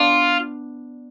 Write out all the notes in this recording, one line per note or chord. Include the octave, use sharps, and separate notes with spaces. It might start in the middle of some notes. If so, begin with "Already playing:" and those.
Already playing: B3 D4 F4